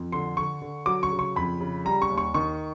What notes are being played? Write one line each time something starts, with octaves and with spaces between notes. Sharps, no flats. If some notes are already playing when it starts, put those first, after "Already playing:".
Already playing: F2
D3 C6
D3 C#6
D3
F#3 D6
C#6
C#3
C#6
F2 B5
C#3
G3 A#5
C#6
D#2
C#6
D#3 C#6